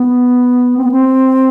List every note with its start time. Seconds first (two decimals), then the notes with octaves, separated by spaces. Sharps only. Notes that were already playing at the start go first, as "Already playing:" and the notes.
Already playing: B3
0.77 C4
0.84 B3
0.91 C4